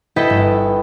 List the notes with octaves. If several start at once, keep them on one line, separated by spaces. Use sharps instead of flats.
E4 A4 B4 D#5 G5 B5
G1